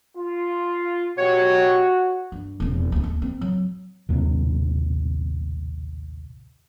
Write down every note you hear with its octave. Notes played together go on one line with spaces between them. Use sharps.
F4
B2 F#4 G4 C#5
G2
E1 F2
D1 D2
D#2
C4
F#3
A#1 D#2 A2 C3